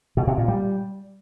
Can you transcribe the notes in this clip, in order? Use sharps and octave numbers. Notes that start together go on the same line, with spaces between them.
B2
C3
A#2
G3